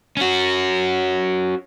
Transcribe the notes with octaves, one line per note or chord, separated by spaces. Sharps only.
C#4 F#4